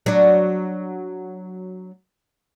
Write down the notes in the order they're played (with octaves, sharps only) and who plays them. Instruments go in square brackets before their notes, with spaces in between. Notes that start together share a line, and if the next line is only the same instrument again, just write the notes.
[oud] F#3 D4